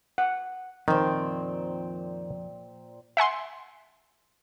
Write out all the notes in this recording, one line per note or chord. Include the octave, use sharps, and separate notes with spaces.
F#5
F2 A#2 D#3 C4
E5 F#5 G#5 C6